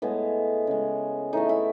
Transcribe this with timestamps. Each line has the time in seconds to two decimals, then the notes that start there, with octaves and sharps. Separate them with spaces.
0.02 A2 G#3 B3
0.67 C#3 G#3
1.33 A2 E3 A3 D#4
1.49 E4